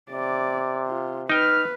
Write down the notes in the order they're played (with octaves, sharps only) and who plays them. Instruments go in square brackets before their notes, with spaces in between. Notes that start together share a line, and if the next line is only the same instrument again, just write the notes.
[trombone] C3 [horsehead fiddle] D5
[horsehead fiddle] F4
[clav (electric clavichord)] D#4 G5 [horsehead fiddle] B4 [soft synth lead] F6